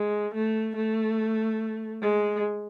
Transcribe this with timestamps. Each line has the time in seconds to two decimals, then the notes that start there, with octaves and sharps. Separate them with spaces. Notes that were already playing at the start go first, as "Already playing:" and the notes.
Already playing: G#3
0.35 A3
0.76 A3
2.01 G#3